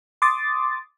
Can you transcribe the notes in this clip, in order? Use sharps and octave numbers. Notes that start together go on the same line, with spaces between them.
C6 D6 D#6 A6